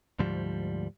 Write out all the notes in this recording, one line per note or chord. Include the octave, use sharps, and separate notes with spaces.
D2 G#2 F3 G3